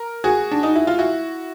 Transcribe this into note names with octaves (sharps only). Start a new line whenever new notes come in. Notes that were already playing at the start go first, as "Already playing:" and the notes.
Already playing: A#4
F#4 G#4
D4
D#4
E4
F4
E4 F#4